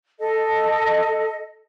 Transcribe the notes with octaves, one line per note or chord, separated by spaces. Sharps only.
A4 D#5